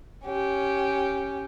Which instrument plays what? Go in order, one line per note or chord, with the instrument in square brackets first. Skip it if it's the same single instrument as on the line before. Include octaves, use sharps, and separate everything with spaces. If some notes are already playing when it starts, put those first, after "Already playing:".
[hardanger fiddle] C#4 G4